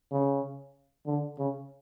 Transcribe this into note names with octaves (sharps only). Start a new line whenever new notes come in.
C#3
D3
C#3